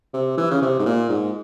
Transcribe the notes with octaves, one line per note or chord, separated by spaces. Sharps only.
C3
E3
C#3
C3
G#2
A#2
G#2